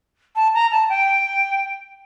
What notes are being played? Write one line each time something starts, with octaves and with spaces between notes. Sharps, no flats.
A5
A#5
A5
G5